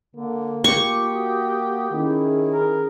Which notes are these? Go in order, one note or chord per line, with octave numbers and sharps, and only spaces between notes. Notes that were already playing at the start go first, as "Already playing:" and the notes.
D3 A#3
F4 G4 G5 C#6 D6
F#4 F#5 D#6
D#3 C#4 E4 G#4
A#4